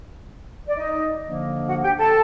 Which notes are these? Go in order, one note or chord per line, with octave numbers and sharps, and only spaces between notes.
D5
D#4 D#5
D3 F3 A#3 D4
F#4 F#5
G4 G5
A4 A5